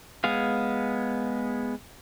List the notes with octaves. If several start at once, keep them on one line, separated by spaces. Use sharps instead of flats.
G#3 B3 G#4 F5